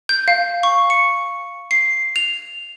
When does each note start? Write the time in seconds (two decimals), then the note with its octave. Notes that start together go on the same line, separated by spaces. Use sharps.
0.09 G6
0.28 F5
0.63 C#6
0.90 C#7
1.71 C7
2.16 F7